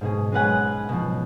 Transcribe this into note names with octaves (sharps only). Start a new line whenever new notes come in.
G#2 B2 G#4
G#3 C#4 B4 F#5 G#5
B2 F3